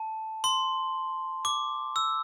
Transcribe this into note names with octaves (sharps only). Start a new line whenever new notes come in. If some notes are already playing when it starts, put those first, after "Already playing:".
Already playing: A5
C6
D6
E6